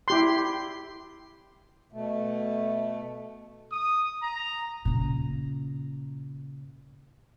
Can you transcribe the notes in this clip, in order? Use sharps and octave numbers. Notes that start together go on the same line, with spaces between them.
E4 G4 C6
B2 A3
D#6
A#5
A#2 C#3